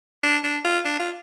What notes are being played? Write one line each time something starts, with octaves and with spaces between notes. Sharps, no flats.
D4
D4
F4
D4
F4